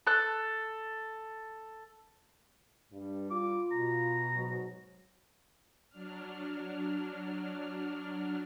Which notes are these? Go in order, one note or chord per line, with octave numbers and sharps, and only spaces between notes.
A4 F#6
G2 G3
F4 D6
B2 A#5
G#2 F#3
F#3 D4 F6